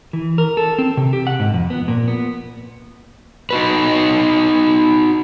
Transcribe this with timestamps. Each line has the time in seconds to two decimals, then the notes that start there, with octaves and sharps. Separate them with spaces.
0.13 E3
0.38 A#4
0.57 A4
0.78 C4
0.97 C3
1.13 G4
1.27 F#5
1.39 G#2
1.54 F2
1.70 B3
1.88 A#2
2.08 B3
3.50 D#4 F#4 B4